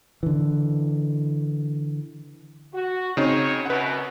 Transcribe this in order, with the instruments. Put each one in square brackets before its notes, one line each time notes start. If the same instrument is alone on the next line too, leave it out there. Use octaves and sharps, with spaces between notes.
[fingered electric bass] D3 E3
[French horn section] F#4
[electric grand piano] C#3 C4 D#4 [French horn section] C#5
[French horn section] F#2 B2 [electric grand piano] B4 F#5